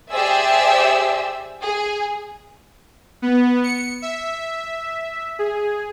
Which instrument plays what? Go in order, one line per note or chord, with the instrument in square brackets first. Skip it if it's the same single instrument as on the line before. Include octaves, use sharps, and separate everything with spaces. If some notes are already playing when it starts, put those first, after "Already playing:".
[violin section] G4 G#4 C5 D5 E5 E6
G#4
[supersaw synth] B3
C#7
E5
G#4